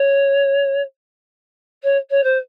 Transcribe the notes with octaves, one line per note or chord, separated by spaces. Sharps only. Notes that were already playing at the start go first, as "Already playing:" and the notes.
Already playing: C#5
C#5
C#5
C5